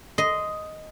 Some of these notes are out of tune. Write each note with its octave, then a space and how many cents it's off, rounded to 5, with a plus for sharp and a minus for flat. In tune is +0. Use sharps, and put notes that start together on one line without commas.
D#5 +5 C6 -15